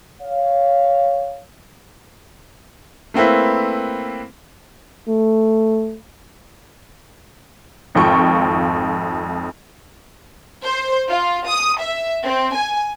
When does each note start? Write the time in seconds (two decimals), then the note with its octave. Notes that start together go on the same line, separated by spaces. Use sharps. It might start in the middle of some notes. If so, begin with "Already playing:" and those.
0.22 C#5 F5
3.14 A3 A#3 C4 E4 B4
5.09 A3
7.95 G#1 F2 F4 G5 C#6
10.63 C5
11.09 F4
11.48 D#6
11.81 E5
12.24 C4
12.55 G#5